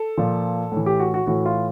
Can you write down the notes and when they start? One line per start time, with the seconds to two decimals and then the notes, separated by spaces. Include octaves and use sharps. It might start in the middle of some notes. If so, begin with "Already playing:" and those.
Already playing: A4
0.17 A#2 F3
0.72 A2 E3
0.86 G4
1.00 F#4
1.14 F#4
1.27 A2 E3 F#4
1.46 F4